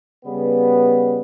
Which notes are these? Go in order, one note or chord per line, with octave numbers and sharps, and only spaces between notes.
C#3 G3 B3